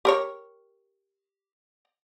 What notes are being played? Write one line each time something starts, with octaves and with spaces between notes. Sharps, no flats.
G4 A#4 C#5